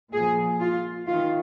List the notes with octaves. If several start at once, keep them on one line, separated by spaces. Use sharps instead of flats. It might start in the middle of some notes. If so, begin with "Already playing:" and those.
A#2 F3 G#4
F4
D#3 F4